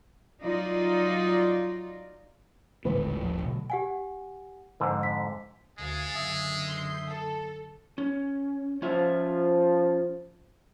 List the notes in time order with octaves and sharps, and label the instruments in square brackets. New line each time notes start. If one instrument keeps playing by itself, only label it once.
[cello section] F#3 D#4 F4 D5
[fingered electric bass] D#1 A1 A2 [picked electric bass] D3 G#3 A3 [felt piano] B4
[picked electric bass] D#2 F3
B2 D3 F#3
[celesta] G4 F#5 G#5
[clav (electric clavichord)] F2 G#2 D3
[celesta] B6
[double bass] D2 [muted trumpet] G#3 [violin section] G#4 F5 A6
[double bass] F#1 D3 [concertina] E5 D#6
[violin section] C6 G6 C7
A4
[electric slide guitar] C#4
[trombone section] F3 [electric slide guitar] C#4 F4 E5